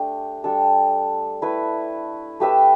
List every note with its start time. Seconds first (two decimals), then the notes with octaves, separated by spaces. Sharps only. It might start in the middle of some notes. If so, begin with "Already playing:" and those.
Already playing: A3 D4 G4
0.44 G3 D4 A4
1.42 A3 E4 B4
2.40 A3 G4 B4 E5